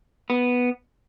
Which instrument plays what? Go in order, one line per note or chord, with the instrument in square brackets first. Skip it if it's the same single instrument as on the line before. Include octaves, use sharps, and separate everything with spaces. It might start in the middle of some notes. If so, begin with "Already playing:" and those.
[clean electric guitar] B3